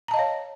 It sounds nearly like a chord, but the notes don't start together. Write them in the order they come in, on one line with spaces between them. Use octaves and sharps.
A#5 A5 D#5 F5 C#5